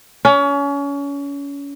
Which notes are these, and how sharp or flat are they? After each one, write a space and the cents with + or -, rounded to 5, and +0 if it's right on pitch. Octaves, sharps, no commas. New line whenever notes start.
C#4 +30